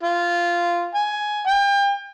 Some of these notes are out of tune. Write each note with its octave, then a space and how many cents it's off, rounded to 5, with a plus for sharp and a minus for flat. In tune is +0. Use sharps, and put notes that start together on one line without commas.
F4 -10
G#5 +10
G5 +35